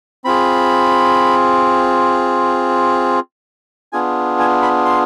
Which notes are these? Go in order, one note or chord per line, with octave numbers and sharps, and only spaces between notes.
C4 F4 G#4 B5
B3 D4 F4 G#4 G#5
G#5
B5
C6